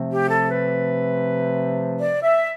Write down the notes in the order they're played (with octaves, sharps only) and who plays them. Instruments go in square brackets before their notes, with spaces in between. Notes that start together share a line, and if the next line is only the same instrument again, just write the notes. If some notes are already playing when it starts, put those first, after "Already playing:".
Already playing: [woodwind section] C3 F3 A3 C4
G4
A4
B4
D5
E5